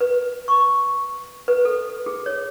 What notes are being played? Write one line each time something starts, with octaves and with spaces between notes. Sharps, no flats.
B4
C#6
B4
A4
G#4
C#5